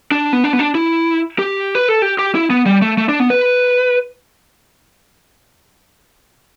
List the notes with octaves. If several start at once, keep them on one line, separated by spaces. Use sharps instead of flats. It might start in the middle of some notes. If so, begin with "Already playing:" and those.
D4
B3
D4
B3
D4
E4
G4
B4
A4
G4
G4
E4
B3
G3
A3
A3
D4
B3
B4